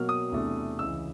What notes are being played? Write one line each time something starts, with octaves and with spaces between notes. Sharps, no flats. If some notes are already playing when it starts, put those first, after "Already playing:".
Already playing: B2 F#3 A#3 F6
D#6
E2 C3 E3 A3 D4
C#2 C#3 E3 E6